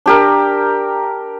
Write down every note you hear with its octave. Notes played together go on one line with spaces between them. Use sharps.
D4 G4 A#4